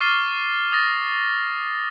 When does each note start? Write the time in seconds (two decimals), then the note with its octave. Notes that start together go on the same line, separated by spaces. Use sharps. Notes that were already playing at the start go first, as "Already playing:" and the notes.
0.01 C#6 D6 F6 A6 C7 G7
0.72 D#6 A6 A#6